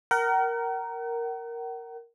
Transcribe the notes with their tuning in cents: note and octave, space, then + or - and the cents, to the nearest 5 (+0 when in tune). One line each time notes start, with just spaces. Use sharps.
A#4 +0 F#5 +45